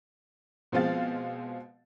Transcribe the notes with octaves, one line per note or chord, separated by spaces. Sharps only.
B2 F3 G#3 C4 F5 A6